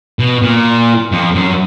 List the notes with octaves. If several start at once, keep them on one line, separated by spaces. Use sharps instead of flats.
B2
A#2
F2
F#2